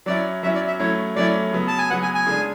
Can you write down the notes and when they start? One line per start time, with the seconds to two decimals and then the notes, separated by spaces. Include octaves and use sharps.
0.06 F#3 C#4 E4 D5
0.43 F#3 C#4 E4 E5
0.55 D5
0.67 E5
0.79 F#3 A3 C#4 E4 C#5
1.16 F#3 A3 C#4 E4 D5
1.53 C#3 F#3 B3
1.68 A5
1.78 G#5
1.90 C#3 F#3 B3 F#5
2.02 G#5
2.15 G#5
2.27 C#3 G#3 D4